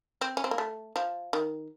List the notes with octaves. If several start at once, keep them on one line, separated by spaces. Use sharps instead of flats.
C4
C#4
C4
A#3
A3
F3
D#3